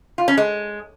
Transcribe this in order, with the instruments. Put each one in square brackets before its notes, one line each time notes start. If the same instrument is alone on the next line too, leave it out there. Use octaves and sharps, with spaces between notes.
[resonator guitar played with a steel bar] F4
C#4
G#3